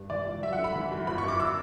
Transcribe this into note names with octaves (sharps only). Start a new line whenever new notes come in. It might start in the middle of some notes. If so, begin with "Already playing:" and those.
Already playing: G2
E3 D5
C#2
F#3 E5
F#5
D3
B5
E3
F#2
G1 B5
C#6
F#2 D6
E6